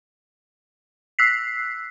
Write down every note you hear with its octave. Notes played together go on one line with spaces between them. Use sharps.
E6 F#6 B6 C7